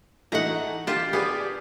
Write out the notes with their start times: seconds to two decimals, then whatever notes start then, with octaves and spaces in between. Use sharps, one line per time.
0.32 E3 A3 D#4 F#5 A#5
0.87 F4 G4 A5
1.13 B3 G4 G#4 D5